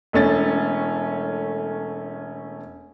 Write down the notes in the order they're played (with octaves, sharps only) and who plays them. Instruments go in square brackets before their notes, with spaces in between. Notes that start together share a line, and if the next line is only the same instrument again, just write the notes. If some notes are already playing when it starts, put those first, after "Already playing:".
[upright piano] E1 A3 C#4 A6